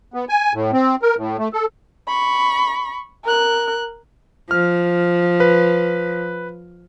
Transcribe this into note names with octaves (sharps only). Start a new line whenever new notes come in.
B3
G#5
A2
C4
A#4
A2
A3
A4
B5 C#6
A#4 F#6
F3 F6
B4